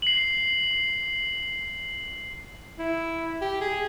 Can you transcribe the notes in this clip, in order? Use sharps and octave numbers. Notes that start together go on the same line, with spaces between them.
C7 F#7
E4
G4
G#4